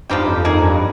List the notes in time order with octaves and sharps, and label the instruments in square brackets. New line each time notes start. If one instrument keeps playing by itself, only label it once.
[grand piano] G2 [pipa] F3 C4 D#4 G4
[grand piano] F2
[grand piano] F2 [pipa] A#3 D#4 G#4
[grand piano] G2